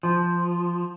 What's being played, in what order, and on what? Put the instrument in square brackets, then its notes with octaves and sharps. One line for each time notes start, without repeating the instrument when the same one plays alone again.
[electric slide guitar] F3